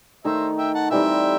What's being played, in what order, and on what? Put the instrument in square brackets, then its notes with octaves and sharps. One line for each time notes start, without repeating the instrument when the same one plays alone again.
[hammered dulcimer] D#3 A3 D#4 [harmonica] C5 E5
[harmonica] E5 G5
F#5 A5
[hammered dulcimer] E3 G3 C4 D#4 [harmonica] E5 G5